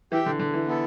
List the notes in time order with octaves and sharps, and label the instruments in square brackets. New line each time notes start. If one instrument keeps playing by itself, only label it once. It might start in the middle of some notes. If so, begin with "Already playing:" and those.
[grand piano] E3 [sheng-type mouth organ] G4 E5 G5
[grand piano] D3
D3
E3
[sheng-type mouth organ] B3 E4 A4